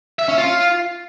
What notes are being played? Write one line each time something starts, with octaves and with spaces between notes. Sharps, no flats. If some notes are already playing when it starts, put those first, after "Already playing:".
E5
C#4
F4